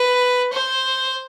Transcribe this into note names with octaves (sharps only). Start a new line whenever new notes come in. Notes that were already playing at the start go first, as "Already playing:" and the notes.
Already playing: B4
C5